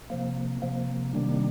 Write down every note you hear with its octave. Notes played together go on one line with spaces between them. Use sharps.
C3 F3 A#3
C3 F3 A#3
C3 D#3 G3 A#3 D4